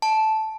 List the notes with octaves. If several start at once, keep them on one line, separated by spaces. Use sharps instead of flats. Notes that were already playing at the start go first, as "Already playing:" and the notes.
A5